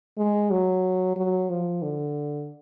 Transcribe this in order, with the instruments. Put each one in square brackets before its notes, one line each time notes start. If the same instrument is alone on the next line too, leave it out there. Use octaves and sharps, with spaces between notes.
[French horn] G#3
F#3
F#3
F3
D3